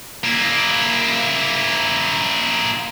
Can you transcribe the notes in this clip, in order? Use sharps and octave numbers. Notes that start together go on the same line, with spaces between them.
A#3 E4